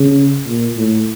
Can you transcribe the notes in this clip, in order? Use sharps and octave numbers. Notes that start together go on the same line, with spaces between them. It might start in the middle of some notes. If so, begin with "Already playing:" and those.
Already playing: C#3
A#2
A2